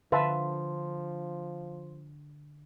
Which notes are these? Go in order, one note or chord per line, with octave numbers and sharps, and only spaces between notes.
D3 F3 B4 E5 F5 A5 C6